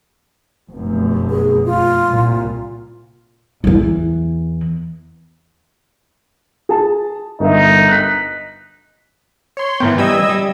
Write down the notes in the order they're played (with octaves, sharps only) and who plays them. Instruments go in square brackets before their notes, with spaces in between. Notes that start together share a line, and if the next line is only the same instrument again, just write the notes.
[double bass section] F1 F#2 B2
[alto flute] G#4
F4
[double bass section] C2 A#2
[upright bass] E2 E3
[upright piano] G#4 A5
[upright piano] G1 A#4 E5 [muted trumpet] D#4
[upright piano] F#6 B6
[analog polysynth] C#5 C6
[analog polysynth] G#2 B3 [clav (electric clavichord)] E3 A#4 G5
[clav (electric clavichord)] E3 G3 C#4 [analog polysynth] D#5 E6 G#6
[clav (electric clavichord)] G3